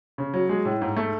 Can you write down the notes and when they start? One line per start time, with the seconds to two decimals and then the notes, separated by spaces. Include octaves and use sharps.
0.18 C#3
0.34 F#3
0.49 G#3
0.65 A2
0.82 G#2
0.96 A3